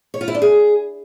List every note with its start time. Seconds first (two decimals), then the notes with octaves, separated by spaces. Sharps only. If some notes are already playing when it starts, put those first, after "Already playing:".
0.14 C#5
0.21 F4
0.28 E4
0.35 D4
0.42 G#4